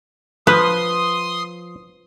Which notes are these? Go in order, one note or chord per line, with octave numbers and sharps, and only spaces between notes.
F3 B4 C6 D#6